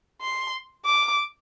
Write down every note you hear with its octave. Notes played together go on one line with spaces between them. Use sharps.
C6
D6